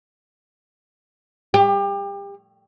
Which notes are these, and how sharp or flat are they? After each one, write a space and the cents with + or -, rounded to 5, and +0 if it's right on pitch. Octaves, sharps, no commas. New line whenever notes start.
G4 +30